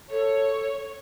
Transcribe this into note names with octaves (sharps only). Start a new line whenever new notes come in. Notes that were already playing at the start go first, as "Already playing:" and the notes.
A4 C#5